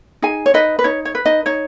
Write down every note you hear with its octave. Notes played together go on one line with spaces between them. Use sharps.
D#4 G#4 G#5
C#5
D#4 B4 D#5
B4
D#4 C#5
C#5
B4
D#4 D#5
D#4 C#5